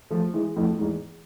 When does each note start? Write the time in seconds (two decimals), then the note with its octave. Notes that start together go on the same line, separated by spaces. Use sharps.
0.10 F3 A3
0.34 E3 G#3
0.56 F2 A2
0.79 E2 G#2